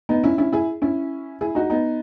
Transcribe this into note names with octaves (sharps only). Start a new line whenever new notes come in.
B3 D#4
C#4 E4
C#4 E4
E4 G#4
C#4 E4
E4 G#4
D#4 F#4
B3 D#4